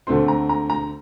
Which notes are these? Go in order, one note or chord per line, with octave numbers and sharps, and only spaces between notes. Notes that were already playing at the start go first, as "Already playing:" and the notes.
D2 D3 A3 C4 C6
A#5
A#5
A#5